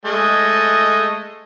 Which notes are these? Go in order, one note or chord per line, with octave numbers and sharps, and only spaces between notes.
G#3 A3 D#5